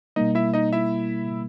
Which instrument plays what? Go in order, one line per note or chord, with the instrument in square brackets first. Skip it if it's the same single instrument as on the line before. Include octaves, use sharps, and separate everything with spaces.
[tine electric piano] B2 G3 A#3 [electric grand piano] D#4 D#5
[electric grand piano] E4 E5
D#4 D#5
E4 E5